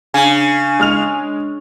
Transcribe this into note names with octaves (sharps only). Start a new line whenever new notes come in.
C#3 D4 G#5
G#3 F6 F7